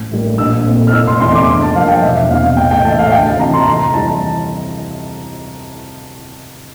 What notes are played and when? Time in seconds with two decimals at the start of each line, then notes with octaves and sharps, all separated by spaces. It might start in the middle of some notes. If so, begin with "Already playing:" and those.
Already playing: A1
0.12 A2 G3 A#3
0.38 A#1 E6
0.66 A#2 A3 C4
0.87 F6
0.93 F1 E6
1.07 C6
1.21 E2 C3 E3 C6
1.35 D6
1.48 G2
1.62 A5
1.75 F3 A#3 F5
1.88 G5
2.02 E1 E5
2.30 E2 C3 F5
2.57 A1 G5
2.71 G5
2.85 A2 E3 A5
2.92 E5
2.99 F5
3.12 D2 G5
3.26 A5
3.40 C3 E3 A#5
3.53 C6
3.67 F2 A#5
3.94 E3 G3 A5